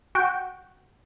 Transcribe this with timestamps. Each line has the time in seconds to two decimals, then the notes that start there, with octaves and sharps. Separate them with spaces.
0.15 F#4 G5